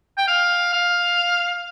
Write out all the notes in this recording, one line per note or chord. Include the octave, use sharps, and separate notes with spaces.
G5
F5
F5